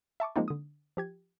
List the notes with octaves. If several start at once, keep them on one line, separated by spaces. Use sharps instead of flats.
E5 A5 C#6 D6
F3 G#3 A#3 C4 D#4 F4
D3 D#6
F3 G4 G#6